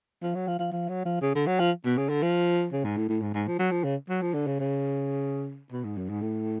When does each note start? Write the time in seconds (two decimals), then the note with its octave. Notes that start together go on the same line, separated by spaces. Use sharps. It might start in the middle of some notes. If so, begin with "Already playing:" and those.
0.23 F3
0.35 F#3
0.47 F3
0.59 F3
0.72 F3
0.89 F#3
1.05 F3
1.21 C#3
1.35 D3
1.47 F#3
1.60 F3
1.85 B2
1.97 C#3
2.09 D3
2.22 F3
2.72 C#3
2.84 G#2
2.97 A2
3.09 A2
3.22 G#2
3.34 G#2
3.47 F3
3.59 F#3
3.71 F3
3.84 C#3
4.09 F#3
4.22 F3
4.34 D3
4.47 C#3
4.60 C#3
5.72 B2
5.84 G#2
5.97 F#2
6.09 G#2
6.21 A2